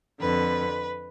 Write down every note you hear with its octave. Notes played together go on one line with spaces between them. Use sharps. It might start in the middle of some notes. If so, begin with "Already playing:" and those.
F2 D3 B4